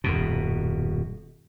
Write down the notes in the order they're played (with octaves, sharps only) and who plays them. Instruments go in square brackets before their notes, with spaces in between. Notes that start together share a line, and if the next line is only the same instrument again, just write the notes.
[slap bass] D#1 F#2 B2